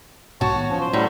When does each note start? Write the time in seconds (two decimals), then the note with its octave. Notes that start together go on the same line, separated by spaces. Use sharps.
0.41 B1 G#2 B2 F#4 C#5 A5
0.54 A2 D#3 B3
0.70 E3 F3 C#4
0.81 C5
0.93 A2 F#3 G3